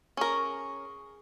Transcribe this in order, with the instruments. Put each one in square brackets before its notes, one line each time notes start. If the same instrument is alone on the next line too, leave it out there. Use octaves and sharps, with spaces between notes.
[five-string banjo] C#4 A#4 [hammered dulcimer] G#4 C#6